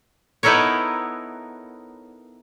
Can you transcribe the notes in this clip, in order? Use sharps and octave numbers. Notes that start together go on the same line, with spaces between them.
B3 D#4 E4 A4 A#4 C#5